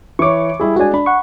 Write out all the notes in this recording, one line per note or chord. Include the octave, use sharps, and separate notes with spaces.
E3 C#5 C#6 D6
G3 E4 G#4
G#3 D4 F#4 G#5
D4 B5
F#5 C#6